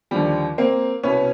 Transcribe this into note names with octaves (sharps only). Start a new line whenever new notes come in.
D#2 D3 F3 G3
A#3 C4
C2 B2 B3 C#4